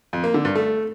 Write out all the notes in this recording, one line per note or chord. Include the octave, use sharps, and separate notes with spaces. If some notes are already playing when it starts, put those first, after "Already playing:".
F2
A#3
D3
G2
A3